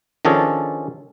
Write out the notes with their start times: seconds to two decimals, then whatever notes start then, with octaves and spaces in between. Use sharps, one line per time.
0.25 D#3 F3 C#4 D4 G#4 A4